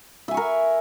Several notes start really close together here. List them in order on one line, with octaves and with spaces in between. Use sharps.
E5 G#5 C#6 A#4